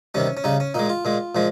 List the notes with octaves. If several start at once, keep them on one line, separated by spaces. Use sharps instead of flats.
C3 D#3 G3 C#4
C#4
C#3 G3 D#4
C#4
A#2 G#3 D#4
F4
A#2 G#3
A#2 F3 G#3